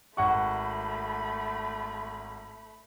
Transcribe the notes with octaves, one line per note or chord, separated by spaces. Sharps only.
G#1 A3 F#5 B5 C#6